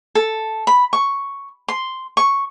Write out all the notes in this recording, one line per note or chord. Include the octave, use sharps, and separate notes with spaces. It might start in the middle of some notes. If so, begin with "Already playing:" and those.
A4
B5
C#6
C6
C#6